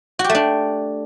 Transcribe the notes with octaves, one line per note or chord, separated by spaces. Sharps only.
F#4
G4
A3
D4